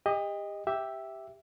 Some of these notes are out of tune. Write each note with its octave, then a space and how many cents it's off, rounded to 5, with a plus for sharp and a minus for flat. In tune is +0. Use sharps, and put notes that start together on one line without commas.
G4 +35 D#5 +0
G4 +0 E5 +0